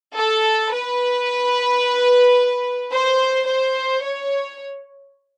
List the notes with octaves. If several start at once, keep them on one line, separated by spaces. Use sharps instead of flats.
A4
B4
C5
C5
C#5